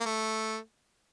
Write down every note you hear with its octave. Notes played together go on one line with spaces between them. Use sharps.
A#3
A3